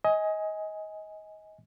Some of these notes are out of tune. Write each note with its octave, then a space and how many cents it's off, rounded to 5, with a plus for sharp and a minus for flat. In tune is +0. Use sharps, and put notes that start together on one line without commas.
D#5 +25 G#5 +0